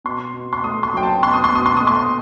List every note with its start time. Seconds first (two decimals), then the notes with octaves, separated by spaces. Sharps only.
0.04 B2 C6
0.34 B2
0.53 C6
0.64 A3 D#6
0.83 C6
0.94 F#3 G5
1.03 A5
1.23 B2 C6
1.33 D#6
1.44 C6
1.52 B2 D#6
1.66 C6
1.77 A3 D#6
1.87 C6